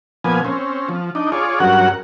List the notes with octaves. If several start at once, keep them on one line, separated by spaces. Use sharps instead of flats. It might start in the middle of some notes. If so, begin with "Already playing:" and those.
A#2 F3 B3 G#5
C4 C#4
F3
D4 D#4
F4 G#4 C#5 D5
G2 F#3 C#4 F#4 A#4 F#5